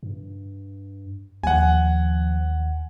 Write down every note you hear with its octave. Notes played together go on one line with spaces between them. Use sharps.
G2
D#2 F3 F#5 G#5